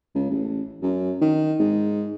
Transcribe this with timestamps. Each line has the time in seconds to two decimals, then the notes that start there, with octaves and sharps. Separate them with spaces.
0.15 C#2
0.30 A1
0.82 F#2
1.21 D#3
1.60 G#2